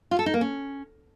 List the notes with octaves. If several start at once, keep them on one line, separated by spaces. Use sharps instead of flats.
F4
A4
D#4
A#3
C#4